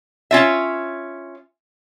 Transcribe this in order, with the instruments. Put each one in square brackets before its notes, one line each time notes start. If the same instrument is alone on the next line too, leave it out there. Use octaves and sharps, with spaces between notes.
[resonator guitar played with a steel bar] C#4 F4 E5